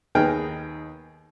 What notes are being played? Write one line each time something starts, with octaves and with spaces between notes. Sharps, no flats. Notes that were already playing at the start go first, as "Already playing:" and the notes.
D#2 B3 D#4 G#4 G5 F6